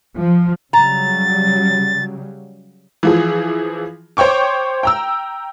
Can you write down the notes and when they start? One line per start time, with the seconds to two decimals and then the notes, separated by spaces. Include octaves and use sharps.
0.15 F3
0.73 C#3 F#3 G3 A#5 A6
3.03 E3 F3 G#4
4.17 C5 C#5 G5 C#6 D6
4.83 G5 A#5 E6